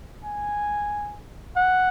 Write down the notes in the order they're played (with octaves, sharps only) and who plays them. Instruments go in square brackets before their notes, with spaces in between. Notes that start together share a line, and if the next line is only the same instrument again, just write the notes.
[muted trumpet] G#5
F#5